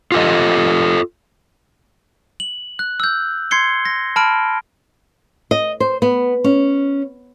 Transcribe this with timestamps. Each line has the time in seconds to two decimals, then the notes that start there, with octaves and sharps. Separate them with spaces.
0.12 F4 G4 A4 D#5
2.40 F#7
2.79 F#6
3.00 E6 G6
3.51 C6 G#6 C7 C#7 G7
3.85 A#6
4.16 A5 B5 F6 D7
5.51 D#5
5.80 C5
6.02 B3
6.44 C#4